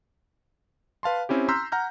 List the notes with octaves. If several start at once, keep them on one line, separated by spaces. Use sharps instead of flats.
B4 F5 A5 C6
C4 C#4 E4 G4
A#5 C6 E6 F6 G6 B6
F#5 A#5 F6 G6